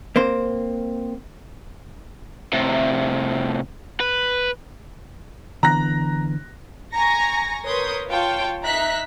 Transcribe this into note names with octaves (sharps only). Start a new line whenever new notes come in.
A#3 C4 C5
A2 C3
B4
D3 E3 B3 A#5 F#6 A#6
G#5 A#5 C#6 A#6
A#4 B4 C#5 C6 D#6 G6
F4 C#5 F5 G5 A5
D#4 E5 A#5 F#6 B6